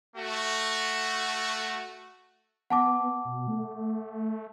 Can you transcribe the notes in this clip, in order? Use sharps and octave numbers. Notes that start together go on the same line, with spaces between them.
A3 F#4
B3 F#5 A5 D6
B2
A3